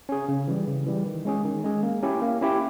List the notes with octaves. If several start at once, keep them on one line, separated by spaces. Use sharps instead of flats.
C#4 G#4
C#3
E3 G3
C#3
E3 G3
D#3
G#3 C#4 G#4
D#3
G#3 C#4 G#4
A#3
C#4 E4 G4
A#3
C#4 E4 G4